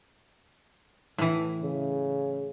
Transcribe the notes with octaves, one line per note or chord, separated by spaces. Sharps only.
A2 E3
C#3